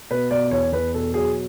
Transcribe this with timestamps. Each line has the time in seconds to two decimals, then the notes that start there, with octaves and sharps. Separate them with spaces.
0.11 B2 B4
0.31 B2 D5
0.51 E2 C#5
0.72 E2 B4
0.94 B2 A4
1.14 F#3 G#4